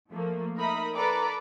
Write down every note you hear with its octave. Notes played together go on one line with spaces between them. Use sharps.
F3 A3 A#3
D#4 A#4 E5 B5 D#6
A4 B4 D5 A#5 B5 D6